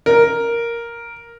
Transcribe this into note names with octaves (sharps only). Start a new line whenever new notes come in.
A#4